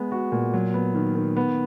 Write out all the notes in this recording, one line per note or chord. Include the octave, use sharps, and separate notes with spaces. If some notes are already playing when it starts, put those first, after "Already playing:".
Already playing: G#3 B3
F#4
A#2
F#3
B3
D#3
D#3
B3